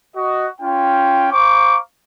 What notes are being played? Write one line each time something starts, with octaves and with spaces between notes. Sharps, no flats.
F#4 D#5
C#4 F4 G5
C5 F5 A#5 C#6 D6